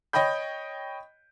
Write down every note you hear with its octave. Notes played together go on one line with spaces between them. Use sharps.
C#5 D#5 G5 B5 G6